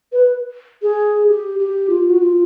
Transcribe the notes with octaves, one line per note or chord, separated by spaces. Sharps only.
B4
G#4
G4
G4
F4
F#4
F4